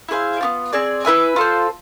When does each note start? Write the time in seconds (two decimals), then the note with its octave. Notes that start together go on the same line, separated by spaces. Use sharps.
0.09 E4 G#4 C5 F5
0.41 B3 D4 F4
0.73 C4 G#4 D5
1.05 E4 B4 E5 G#5
1.36 F4 A4 C5